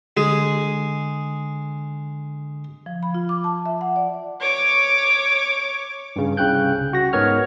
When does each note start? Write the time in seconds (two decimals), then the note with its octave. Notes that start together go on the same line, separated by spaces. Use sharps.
0.17 D3 G#3 G#4
2.86 F3
3.03 B5
3.14 F4
3.29 D6
3.44 A5
3.66 E5
3.81 F#5
3.96 D5
4.40 C#5 D6
6.16 G2 C#3
6.37 C2 C#3 G5 F#6 G6
6.93 F#4 A#6
7.13 G#2 B3 A#4 C#5 F6